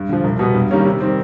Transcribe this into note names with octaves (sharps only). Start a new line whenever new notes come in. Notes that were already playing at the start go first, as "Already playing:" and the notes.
Already playing: G2
D3 F3
C2
B2 G3 B3
G2
D#3 G3 A#3 C#4
C3
D#3 G3 C4